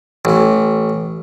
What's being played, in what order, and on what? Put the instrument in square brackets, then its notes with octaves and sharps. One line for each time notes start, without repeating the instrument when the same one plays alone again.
[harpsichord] A1